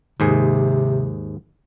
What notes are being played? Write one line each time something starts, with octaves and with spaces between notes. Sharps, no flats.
D#2 G#2 C3 G#4